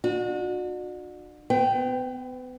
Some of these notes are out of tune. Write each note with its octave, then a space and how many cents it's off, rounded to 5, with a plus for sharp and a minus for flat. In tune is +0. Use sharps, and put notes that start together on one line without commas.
D4 +35 F#4 -35
B3 +35 B4 +40 G5 +0